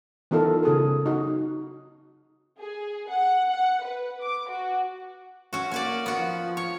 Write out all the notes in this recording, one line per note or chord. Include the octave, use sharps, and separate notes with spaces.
E3 B3 D#4 F4 A4 A#4
C#3 G#4 A4
D#4 F#4
G#4
F#5
F#5
B4
D6
F#4
C#4 F#4
A#3 C#4 F#4 D5
B3 F#4
F3
C#5